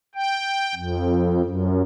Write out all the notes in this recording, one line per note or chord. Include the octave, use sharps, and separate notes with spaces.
G5
F2
F#2